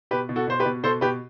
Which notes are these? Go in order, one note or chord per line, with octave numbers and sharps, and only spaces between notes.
B2 G4 B4
B2
F#4 A4
B2 C5
G4 B4
B2
B2 A4 C5
B2 G4 B4